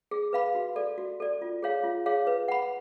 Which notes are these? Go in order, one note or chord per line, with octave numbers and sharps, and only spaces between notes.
G#4
B4 F5 B5
F#4
A4 D5
F#4
A4 D5
F4
G#4 C#5 F5
F4
G#4 C#5 F5
B4
F#5 B5